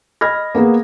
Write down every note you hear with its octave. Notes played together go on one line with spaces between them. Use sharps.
D#5 B5 F6 G#6 A#6
A#3 B3 G#4 A#4